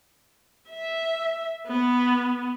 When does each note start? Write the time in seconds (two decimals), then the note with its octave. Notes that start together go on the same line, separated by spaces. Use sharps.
0.70 E5
1.67 B3